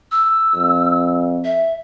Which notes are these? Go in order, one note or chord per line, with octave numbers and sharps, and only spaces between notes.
E6
F2
E5